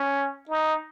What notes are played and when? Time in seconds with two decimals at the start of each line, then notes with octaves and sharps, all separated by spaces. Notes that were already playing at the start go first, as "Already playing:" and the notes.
Already playing: C#4
0.50 D#4